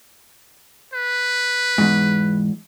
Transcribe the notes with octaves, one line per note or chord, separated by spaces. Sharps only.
B4
E2 G#2